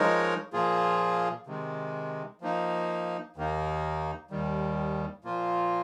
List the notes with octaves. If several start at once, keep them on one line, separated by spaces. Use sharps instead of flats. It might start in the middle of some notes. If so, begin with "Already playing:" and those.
Already playing: F3 G#3 D#4 A#4 C#5
A#2 F3 A#3 F4 G#4
C3 D#3 G#3
F3 A#3 D#4
D#2 D#3 A#3 D#4
D#2 D#3 G3
A#2 F3 A#3 F4